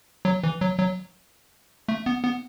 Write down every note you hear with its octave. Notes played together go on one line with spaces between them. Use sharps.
F#3
E3
F#3
F#3
A3
B3
B3